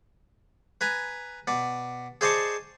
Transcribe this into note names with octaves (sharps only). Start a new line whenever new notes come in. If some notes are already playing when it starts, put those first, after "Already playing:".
B4 G#5 A#5
B2 D5
G#4 C5 D5 D#5 A5 C#6